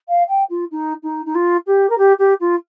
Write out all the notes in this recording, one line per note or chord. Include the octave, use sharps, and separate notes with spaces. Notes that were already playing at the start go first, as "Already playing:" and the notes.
F5
G5
F4
D#4
D#4
D#4
F4
G4
A#4
G4
G4
F4